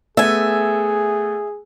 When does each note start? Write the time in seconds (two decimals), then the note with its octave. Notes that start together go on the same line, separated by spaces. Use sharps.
0.17 A3 B3 G#4 E5 G#5